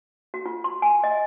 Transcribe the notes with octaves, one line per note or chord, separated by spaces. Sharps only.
F#4
F4
C6
G#5
D#5